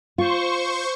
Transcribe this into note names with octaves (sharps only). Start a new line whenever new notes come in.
F4 C5 C#6